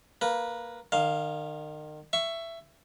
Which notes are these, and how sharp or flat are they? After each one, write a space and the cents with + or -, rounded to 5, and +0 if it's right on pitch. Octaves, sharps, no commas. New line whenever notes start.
A#3 +0 B4 -15
D#3 -35 F5 +0
E5 +15 C#6 +0